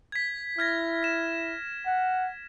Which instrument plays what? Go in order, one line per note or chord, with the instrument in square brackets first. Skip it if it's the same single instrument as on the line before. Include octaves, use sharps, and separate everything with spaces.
[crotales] G#6 B6
[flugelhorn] E4 [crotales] F6 G#6 A#6
[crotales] A#6 E7
[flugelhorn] F#5